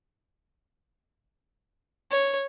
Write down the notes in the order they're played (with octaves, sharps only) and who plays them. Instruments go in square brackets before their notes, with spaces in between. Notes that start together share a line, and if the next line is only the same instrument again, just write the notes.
[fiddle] C#5